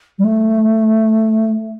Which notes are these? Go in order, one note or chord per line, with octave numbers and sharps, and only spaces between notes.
G3
A3